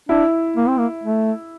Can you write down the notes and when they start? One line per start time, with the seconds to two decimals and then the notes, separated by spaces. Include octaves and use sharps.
0.09 D4 E4
0.57 A#3
0.68 C4
0.79 A#3
1.04 A3